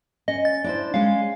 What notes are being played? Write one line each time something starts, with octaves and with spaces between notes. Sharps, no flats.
C#4 D#5
A6
D4 E4 C5
G#3 C#4 F5